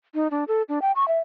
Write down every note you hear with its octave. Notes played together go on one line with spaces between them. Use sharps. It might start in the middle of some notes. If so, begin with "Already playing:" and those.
D#4
D4
A4
D4
G5
C#6
E5